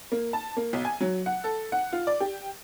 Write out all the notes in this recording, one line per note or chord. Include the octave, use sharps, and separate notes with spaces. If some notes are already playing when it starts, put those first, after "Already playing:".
A#3
A5
A#3
B1
G#5
F#3
F#5
A4
F#5
F4
D5
G4